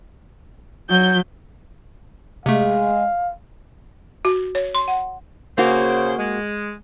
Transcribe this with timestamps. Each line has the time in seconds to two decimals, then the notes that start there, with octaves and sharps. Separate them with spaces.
0.90 F#3 G6
2.46 C3 G#3 A3 F5
4.25 F#4
4.55 C#5
4.75 C6
4.88 F#5
5.58 C#3 A#3 F#4 C5
6.18 G#3